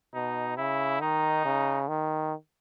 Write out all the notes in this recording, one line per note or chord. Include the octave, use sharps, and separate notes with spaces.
B2 D#4
C#3 E4
D#3 D#4
C#3
D#3